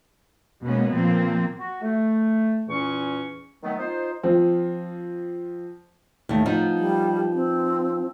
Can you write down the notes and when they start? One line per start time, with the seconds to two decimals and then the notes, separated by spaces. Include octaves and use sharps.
0.65 B2 G#3 A#3 B3 C#4
0.94 A#2 F3 A#3 C4
1.58 F#4
1.82 A3
2.67 E2 A#2 E3 C#4 C#6
3.63 D#3 F#3 A3 B3
3.78 D#4 F4 C5
4.23 F3 C4
6.29 D#2 A3
6.46 F3 B3 D#4
6.78 G3
7.34 C4